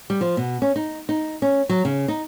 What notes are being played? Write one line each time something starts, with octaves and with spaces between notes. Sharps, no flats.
G3
F3
B2
C#4
D#4
D#4
C#4
F#3
C#3
D#4